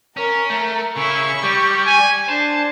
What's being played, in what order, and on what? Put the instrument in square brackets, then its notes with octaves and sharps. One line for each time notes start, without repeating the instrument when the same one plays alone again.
[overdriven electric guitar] C#4 [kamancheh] A#4 A#5
[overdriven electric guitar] A3
[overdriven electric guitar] C#3 C#4 [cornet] E4 [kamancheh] C#6
[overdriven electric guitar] G3 [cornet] G4
[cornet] G#5
[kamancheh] D4 [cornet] C5 [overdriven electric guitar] A5